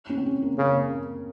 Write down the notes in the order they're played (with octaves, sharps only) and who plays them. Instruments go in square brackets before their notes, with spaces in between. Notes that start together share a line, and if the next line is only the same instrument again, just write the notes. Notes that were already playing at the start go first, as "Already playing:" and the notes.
[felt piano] C#4
C4
C#4
A#3
[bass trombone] C#3 [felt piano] A#3